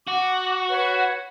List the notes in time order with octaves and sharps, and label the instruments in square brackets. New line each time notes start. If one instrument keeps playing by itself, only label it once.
[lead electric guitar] F#4 [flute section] F#5 D6
[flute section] B4 C#5 F#5